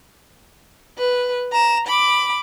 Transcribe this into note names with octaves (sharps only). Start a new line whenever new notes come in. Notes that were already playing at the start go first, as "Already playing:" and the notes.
B4
A#5 E7
B5 D6